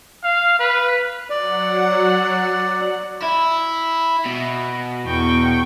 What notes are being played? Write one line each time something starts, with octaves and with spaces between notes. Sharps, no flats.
F5
B4
F#3 D5 F#5
E4
B2
E2 G5 C#6